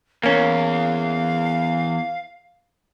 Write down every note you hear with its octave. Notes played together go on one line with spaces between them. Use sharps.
E2 A#3 C#4 F5